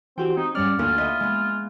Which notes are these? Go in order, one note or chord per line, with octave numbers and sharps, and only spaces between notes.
E3 C4 F#4 G4 G5
C4 D#4
G2 G3 C#4 D5 F#5 F6
D2 A#3 F4
B4 D#5 E5
G#3 B3